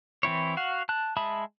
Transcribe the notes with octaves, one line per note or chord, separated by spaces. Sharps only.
E3 C4 E4 C#5
F#4 F5 F#5
A5 F#6
G#3 E5 A5 B5 D#6